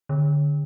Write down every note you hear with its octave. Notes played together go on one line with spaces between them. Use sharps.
D3